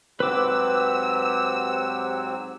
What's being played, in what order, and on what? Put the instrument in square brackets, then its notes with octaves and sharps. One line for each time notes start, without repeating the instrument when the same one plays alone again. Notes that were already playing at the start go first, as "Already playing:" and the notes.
[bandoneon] G#2 F#3 C4 [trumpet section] G4 F#5 [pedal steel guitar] B4 D6 [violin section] E6